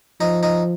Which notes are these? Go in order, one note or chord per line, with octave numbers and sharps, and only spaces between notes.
F3 D#4
D#4